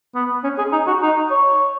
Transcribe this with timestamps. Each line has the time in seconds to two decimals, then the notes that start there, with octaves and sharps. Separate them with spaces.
0.15 B3
0.44 C#4
0.58 G#4
0.72 D#4
0.87 F#4
1.02 D#4
1.31 C#5